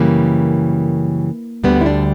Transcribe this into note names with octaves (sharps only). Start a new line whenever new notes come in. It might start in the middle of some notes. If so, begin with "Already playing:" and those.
Already playing: F#2 C#3 E3 G3 A#3
D2 D3 G3 B3
E4
D4